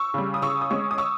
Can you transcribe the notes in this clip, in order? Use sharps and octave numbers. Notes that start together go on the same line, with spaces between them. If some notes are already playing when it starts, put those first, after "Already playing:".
Already playing: C#6 E6
C#3 G3
D#6
C#3 C#6 E6
D#6
G#3 C#4 C#6 E6
D#6
C#6 E6